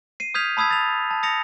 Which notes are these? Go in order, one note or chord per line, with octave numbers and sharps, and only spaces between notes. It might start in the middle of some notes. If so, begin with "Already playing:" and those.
C7 D#7
D#6 F6 G6 G#6 B6 F7
A5 B5 D#6 E6 G#6 B6
A6 F7
A5
D#6 A6 A#6 C#7 F7